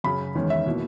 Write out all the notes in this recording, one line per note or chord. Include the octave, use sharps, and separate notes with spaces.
F#2 C#3 F#3 B5
E2 D#3 G#3 C#4
E5
B2 A#3 E4